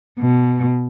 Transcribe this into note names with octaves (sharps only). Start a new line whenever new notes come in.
B2